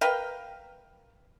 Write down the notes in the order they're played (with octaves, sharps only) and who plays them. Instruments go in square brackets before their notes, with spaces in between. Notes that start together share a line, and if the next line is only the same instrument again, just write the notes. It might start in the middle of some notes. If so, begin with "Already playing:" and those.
[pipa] A#4 B4 F5 G5